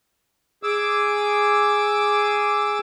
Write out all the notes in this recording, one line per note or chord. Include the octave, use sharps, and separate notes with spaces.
G#4 D6 E6